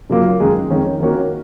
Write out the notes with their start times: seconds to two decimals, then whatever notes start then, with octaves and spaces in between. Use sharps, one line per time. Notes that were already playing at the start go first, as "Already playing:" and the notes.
0.10 F#2 C#3 F#3 A#3 F4
0.40 F#2 D#3 G#3 D#4 G#4
0.70 F2 D#3 G#3 C#4
1.00 D#3 A#3 C#4 F#4 A#4